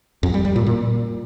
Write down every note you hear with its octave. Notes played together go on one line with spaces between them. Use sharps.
F2
G3
G3
A#2
A#2